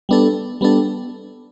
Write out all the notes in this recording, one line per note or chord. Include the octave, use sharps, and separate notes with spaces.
G3 B3 D4 A4
G3 B3 D4 A4